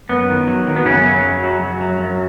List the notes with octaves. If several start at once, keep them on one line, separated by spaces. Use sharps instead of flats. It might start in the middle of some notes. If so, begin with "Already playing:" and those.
F#2 B3
D#3
F#3
D#3
B3
F#2 C#3 C#4
F#3
F#2
F#3
F#2
F#3
F#2